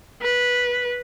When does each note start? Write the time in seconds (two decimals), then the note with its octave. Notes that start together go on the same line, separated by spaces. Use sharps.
0.22 B4